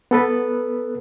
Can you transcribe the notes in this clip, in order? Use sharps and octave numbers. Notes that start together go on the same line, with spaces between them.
B3 A4 B4